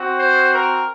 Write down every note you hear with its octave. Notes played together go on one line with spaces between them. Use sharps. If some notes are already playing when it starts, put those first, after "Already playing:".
Already playing: C4 F#4
C5
A#4